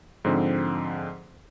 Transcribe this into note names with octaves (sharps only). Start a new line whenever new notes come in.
G#2 D3 F3 C4